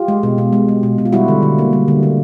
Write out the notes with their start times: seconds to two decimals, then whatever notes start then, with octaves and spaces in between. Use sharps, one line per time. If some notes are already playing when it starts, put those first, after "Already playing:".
Already playing: F4 G4
0.08 G#3
0.23 B2
0.38 B2
0.53 G#3
0.68 G#3
0.83 B2
0.98 B2
1.05 F4
1.13 G3 E4 F#4
1.28 D3
1.42 D3
1.58 A#3
1.73 G3
1.88 D3
2.03 D3